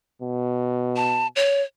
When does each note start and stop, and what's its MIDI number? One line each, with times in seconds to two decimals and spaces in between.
0.22 1.28 47
0.96 1.27 81
1.36 1.62 73